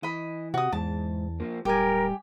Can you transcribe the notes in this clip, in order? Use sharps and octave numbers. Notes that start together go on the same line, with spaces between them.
E3 D#5 B5
C3 F#4 D#6
E2 G#2 A5
F3 A#3
D1 G3 G4 A#4 G#5